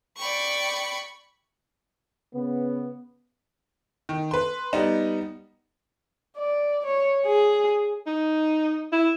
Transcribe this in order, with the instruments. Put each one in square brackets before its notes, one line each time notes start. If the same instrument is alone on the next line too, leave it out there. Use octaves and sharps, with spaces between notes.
[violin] D5 G5 [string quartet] B5 C#6
[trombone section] C#3 B3
[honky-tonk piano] D#3
B4 C6
G3 B3 D#4
[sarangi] D5
C#5
G#4
[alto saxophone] D#4
E4